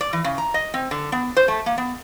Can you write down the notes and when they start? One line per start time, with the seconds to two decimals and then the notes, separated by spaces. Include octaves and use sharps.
0.01 D5
0.13 E3
0.24 C#3
0.38 A#5
0.54 D#5
0.74 C4
0.91 D3
1.12 B3
1.37 C5
1.48 A3
1.66 A#3
1.78 B3